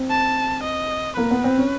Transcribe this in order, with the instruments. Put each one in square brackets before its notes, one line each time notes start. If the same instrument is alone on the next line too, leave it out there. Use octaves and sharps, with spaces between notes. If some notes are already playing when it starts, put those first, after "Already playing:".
Already playing: [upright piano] C4
[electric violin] A5
D#5
[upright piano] A#3 [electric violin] B4
[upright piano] B3
C4
C#4